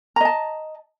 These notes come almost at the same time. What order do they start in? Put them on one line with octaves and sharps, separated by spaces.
A#5 D#5 A5